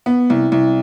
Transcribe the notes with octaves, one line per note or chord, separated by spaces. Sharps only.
B3
C2
C2